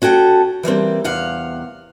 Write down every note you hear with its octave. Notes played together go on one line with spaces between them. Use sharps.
C#4 F#4 A4 G5
E3 G3 A#3 C4
E2 C3 F5 F#5